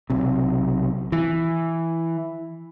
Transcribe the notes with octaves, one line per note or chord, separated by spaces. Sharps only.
B1 C3
E3